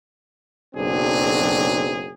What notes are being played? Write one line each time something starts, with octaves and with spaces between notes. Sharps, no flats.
F#1 B1 F#3 C4 D4 G#4